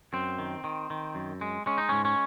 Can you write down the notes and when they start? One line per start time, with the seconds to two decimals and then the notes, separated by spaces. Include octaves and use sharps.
0.13 F#2 C4
0.39 D#3
0.64 D#3
0.90 D#3
1.15 F#2
1.41 G#3
1.66 G#3 C#4
1.78 D#4
1.89 G#2 C#4
2.05 C#4